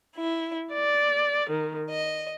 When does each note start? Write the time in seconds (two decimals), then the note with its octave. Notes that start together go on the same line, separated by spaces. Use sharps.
0.15 E4
0.73 D5
1.50 D#3
1.91 D#5